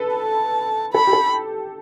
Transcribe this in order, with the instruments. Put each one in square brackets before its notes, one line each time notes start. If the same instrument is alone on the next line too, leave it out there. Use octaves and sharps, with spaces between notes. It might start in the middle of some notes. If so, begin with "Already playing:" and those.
Already playing: [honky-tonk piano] A4 B4
[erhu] A5
[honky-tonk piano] A4 [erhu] B5
[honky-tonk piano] G4
A4